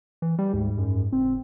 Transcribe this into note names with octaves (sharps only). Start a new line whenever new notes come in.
E3
G3 G4
D2 G#2
F#2
F1 C4